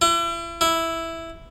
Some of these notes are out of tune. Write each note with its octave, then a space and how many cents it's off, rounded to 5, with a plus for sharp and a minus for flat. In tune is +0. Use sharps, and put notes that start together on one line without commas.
E4 +40
E4 +0